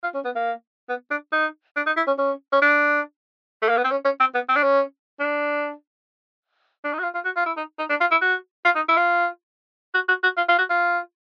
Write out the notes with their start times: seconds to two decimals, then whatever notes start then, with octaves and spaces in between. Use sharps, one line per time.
0.03 F4
0.14 C#4
0.25 B3
0.35 A#3
0.89 B3
1.11 D4
1.33 D#4
1.76 D4
1.86 D#4
1.97 E4
2.07 C#4
2.18 C#4
2.52 C#4
2.62 D4
3.62 A3
3.69 A#3
3.77 B3
3.84 C4
3.91 C#4
4.05 C#4
4.20 C4
4.34 B3
4.49 C4
4.56 D4
4.63 C#4
5.20 D4
6.84 D4
6.93 D#4
6.99 F#4
7.03 F4
7.14 F4
7.25 F#4
7.36 F4
7.46 E4
7.57 D#4
7.79 D#4
7.89 D4
8.01 F4
8.11 E4
8.21 F#4
8.65 F4
8.76 D#4
8.88 E4
8.97 F4
9.94 F#4
10.08 F#4
10.23 F#4
10.37 F4
10.48 F4
10.59 F#4
10.70 F4